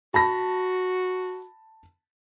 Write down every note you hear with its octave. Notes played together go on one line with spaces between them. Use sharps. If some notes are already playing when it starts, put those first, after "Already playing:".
F#4 A5 B5 A#6